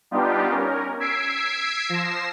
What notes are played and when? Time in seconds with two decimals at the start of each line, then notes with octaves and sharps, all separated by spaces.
0.11 G3 B3 D4 D#4 F4 G4
0.49 C#4 A#4
1.00 E6 G#6 B6 C7 D7
1.89 F3 A#6 C7 E7